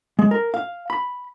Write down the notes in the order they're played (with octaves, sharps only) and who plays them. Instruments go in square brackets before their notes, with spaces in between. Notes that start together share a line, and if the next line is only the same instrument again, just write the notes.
[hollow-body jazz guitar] G#3
A#4
F5
B5